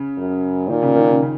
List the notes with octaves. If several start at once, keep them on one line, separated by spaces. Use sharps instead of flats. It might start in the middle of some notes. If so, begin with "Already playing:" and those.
Already playing: C#3
F#2
A#2 D#3
C#3
D#3
C#3
C#3